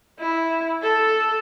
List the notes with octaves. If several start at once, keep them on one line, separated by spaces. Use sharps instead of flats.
E4
A4